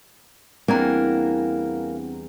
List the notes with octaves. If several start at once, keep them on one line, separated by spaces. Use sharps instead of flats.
E2 G3 A#3 C4 D4 A#5